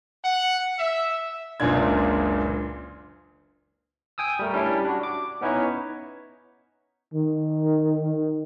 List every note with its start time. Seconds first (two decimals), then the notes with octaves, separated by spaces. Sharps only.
0.23 F#5
0.77 E5
1.60 F#1 C#2 A#2 C#3 D4 G#6
4.18 G5 G#5 D#6 E6
4.39 G3 A3 A#4
4.53 G3 C#4 D4 E4
4.84 D4 F#4
5.03 D6
5.41 B3 C#4 D#4 E4 B4 C#5
7.14 D#3